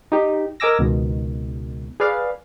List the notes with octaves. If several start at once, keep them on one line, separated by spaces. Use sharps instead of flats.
D#4 G4
A#4 D#5 G#5 D6 E6 A#6
C#2 B2 D#3
G#4 B4 D5 F5